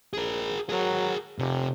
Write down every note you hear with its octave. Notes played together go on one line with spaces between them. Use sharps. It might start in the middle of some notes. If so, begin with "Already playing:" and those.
A#1 G#4 A#4
F#3 G#4 A#4
F1 C3